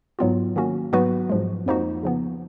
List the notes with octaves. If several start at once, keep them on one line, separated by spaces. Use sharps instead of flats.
G#2 F#3 B3 F4
D#3 A#3 C#4 F#4
G#2 F#3 B3 F#4 B4
G#2 F3 G#3
F2 F3 A#3 D#4 F#4
C#3 F3 B3